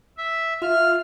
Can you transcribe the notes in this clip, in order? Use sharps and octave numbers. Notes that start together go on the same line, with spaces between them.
E5
F4 E5 F6